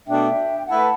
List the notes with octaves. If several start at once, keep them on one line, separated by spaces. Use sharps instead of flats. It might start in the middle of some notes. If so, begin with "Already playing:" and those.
B2 A3 D4 E5 G5
A3 E4 B4 F#5 A5